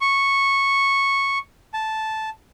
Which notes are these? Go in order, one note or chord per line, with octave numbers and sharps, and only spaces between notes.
C#6
A5